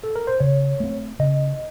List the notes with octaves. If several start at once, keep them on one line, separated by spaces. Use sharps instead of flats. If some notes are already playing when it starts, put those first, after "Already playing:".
A4
A#4
C5
C#3 C#5
A3 C4
C#3 D#5